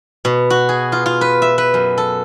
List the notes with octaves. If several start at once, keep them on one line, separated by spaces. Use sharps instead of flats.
B2
F#4
G#4
F4
F4
B4
E5
B4
F#2
A4